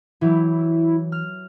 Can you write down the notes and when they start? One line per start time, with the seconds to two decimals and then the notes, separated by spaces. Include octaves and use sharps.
0.21 E3 F#3 E4 G4
1.12 F6